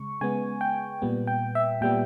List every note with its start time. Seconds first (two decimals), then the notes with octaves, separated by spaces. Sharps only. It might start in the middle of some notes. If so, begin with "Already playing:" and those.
Already playing: C#3 G#3 C#6
0.21 C#3 G#3 B3 G#5
0.61 G5
1.02 A#2 G3 B3
1.27 G5
1.55 E5
1.81 A#2 G3 B3 G5